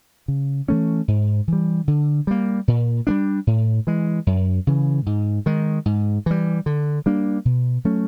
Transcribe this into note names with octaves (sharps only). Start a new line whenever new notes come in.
C#3
E3 A3 C#4
G#2
E3
G3
D3
G3 A#3
A#2
G3 B3 D4
A2
E3 G#3
F#2
C#3 E3
G#2
D#3 G#3
G#2
E3 G3
D3
G3 A#3 D4
B2
F#3 A3 C#4